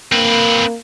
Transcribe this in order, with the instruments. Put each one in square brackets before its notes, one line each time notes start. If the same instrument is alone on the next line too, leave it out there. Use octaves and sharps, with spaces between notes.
[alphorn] A#3 [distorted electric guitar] C4 B4